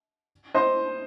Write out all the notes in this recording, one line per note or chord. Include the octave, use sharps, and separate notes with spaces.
C5 D#5